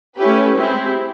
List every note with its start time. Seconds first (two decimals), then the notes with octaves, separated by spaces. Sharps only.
0.16 A3 C#4 E4 G4 B4
0.55 G#3 C4 E4 G4 C5